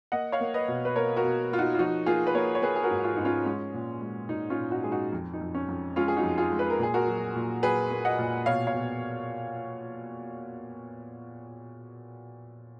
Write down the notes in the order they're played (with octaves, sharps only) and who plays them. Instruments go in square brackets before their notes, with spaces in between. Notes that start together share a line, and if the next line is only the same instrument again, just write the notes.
[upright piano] A#3 D#5 F#5
C#5 F5
A#3
B4 D#5
B2
B4
A#3 A#4 C#5
F#4 A#4
B2
A#3 F4
D#4 F#4
F4
F3 D#4 F#4
A#3 F4 G#4
B4
A#3 A#4 C#5
C#5
A#3 G#4 B4
G#4
F#4 A#4
G#2
F4 G#4
G#2 D#4
C#4 F4
G#3 C#4
A#2
G#3
A#2 D#4
C#4 F4
A#2
D#4 F#4
G#3 G#4
D#4 F#4
F2
D#4
F2
C#4
F2
G#3 C#4 F4
G#4
D#4 F#4
F2
F4 G#4
G#3
B4
A#4
A#2 G#4
F#4 A#4
F#3
A#2
F#3 G#4 B4
A#3
D#5 F#5
A#2
B2 C#5 F5
C#5 F5
B2